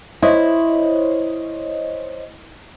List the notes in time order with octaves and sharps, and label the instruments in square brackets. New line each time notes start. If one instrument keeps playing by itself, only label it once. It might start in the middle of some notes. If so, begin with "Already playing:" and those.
[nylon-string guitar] E4 [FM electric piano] C5 C#5 D#5